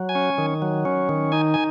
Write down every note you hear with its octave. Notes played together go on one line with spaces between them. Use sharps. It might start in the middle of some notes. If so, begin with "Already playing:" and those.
Already playing: F#3
G#5
C#4
D#3
F#3
C#4
D#3
D#4 G#5
G#5